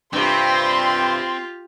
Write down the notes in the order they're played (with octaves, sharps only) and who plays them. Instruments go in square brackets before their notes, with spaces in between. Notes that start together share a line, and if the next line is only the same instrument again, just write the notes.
[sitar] G2 C3 [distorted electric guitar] C4 [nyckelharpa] F4 G4 [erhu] C6